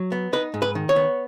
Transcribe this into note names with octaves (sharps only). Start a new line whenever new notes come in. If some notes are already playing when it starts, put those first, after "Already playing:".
Already playing: F#3
B3
D#4 B4
G#2
B4
D#3
C#5
B3